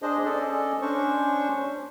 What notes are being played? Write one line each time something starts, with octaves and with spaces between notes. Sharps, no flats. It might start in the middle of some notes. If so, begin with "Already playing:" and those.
D4 G#4 C5 D#5
C#4 A4 D5 D#5
C#4 D4 C5 C#6